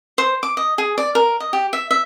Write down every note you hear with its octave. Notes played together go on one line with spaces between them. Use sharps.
C5
D6
D#5
G#4
D5
A#4
D#5
G4
E5
E5